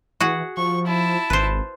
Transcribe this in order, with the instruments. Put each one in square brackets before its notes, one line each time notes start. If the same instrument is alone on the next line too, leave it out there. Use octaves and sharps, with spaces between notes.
[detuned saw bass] E3 [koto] F#4 G#4 F#5
[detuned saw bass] F3 [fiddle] C#6
[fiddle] E4 A5
[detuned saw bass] G#1 [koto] B4 C5